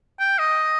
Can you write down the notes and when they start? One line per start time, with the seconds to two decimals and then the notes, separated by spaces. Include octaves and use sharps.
0.20 G5
0.39 D#5